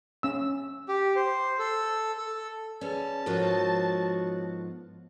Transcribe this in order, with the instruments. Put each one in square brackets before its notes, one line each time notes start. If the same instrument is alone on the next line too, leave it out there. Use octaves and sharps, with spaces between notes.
[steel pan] C#4 E6
[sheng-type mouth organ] G4
C5
A4
A4
[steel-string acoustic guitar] C#4 [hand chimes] G#4 B4 D5 [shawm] A5
[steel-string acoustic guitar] G#2 F3 B3 [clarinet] F#4 [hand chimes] A4 A#4 C#5